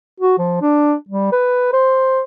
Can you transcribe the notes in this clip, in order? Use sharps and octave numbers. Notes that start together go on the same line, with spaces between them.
F#4
F3
D4
G3
B4
C5